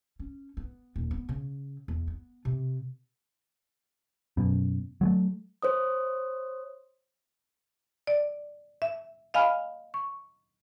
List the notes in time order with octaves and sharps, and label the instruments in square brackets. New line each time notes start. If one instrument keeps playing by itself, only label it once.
[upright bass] C#4
B3
D#1
B3
C#3
E2
B3
C3
[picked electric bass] F#2 B2
F#3 G#3 A3
[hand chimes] C5 C#5 D#6
[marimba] D5
E5
D#5 F5 G#5 B5 F6
C#6